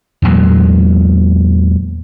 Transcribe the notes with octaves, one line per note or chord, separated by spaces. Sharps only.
E2 A#2 F#3 G#3